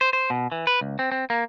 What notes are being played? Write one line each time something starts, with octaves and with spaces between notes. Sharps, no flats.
C5
C5
B2
E3
B4
C#2
C4
C4
A#3